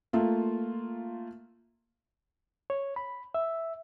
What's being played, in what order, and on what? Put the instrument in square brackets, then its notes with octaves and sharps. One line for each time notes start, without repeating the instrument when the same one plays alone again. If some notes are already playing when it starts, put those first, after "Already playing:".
[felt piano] A3 A#3 F4
[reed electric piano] C#5
B5
E5